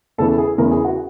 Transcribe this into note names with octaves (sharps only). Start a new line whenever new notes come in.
E2 C#3 E3 A4
G#4
E2 C#3 E3 A#4
G#4
F#4